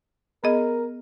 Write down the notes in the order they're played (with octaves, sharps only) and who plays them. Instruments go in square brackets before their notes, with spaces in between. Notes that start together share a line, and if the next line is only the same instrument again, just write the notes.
[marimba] B3 G#4 D#5 [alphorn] A#4